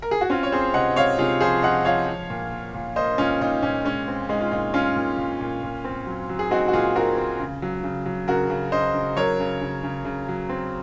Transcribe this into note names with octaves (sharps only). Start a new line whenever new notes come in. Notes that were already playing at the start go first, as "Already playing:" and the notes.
A#4
G#4
F#4
C4 C#4 F4
C#5
C4 G#4 C5
C3 D#5 F#5
C3 C#5 F5
C3 F4 G#4
F3 G#4 C5
F3 D#5 F#5
F3 C#5 F5
F3
A#2
A#3
A#2
A#3 C5 D#5
A#2 C#4 F4
A#2 D#4
A#2 C#4
G#3 C#4
C4
G#3 D#4
F4
A#2 D#4
G#3 C#4 F4
A#2
A#2
A#2
A#2
C4
F#3
F#3
G#4
C4 D#4 F#4
F#4
A#2 F4 G#4
C4 F#4 A#4
C4
C#3
F#3
C#3
F#3
C#3 F#4 A#4
C#3
C#3 C5 D#5
C#3
F#3 A#4 C#5
C#3
C#3
C#3
C#3
F#3
C4